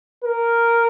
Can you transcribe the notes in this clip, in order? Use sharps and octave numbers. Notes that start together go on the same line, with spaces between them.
A#4